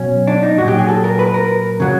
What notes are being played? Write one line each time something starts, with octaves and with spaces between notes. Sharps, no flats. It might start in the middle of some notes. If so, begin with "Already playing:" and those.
Already playing: B2 F#3 C#4
D4
D#4
A#2 F#3 F#4
G4
G#4
A4
A#4
B4
A#4
C#3 F#3